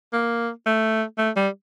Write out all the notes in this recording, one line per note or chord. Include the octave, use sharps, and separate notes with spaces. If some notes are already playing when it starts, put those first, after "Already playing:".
A#3
A3
A3
G3